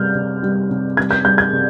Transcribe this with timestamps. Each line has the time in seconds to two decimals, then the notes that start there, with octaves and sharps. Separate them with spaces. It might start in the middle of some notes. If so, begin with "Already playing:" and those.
Already playing: C3 G3 F6 G6
0.15 C3
0.43 G3
0.70 C3
0.97 G3 G#6
1.11 G6
1.25 G3 G6
1.38 G#6
1.53 C3